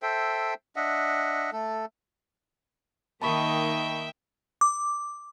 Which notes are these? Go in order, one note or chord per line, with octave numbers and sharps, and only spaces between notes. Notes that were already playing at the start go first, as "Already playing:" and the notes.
A4 C5 E5 G5
D4 D#5 E5 F#5
A3 A4
D#3 A#3 D#4 E5 G5 A5 B5 C#6
D6